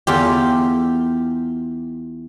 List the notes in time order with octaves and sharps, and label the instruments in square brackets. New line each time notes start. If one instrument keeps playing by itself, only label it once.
[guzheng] E2 F4 G4